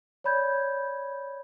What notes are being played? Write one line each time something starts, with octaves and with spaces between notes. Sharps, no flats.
C#5 D5 B5 G6 G#6